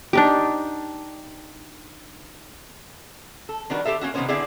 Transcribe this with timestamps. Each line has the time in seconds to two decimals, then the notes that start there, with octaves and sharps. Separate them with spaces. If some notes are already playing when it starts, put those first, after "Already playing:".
0.13 D4 D#4 G4
3.49 A4
3.70 D#3 G3 D4 F#4 A#4 B4
3.85 G4 A4 C5 E5
4.01 A#3 C#4 E4 F#4
4.14 C3 D#3 A#3 B3 C#4 C5
4.28 D3 B3 C4 E4 G#4 D5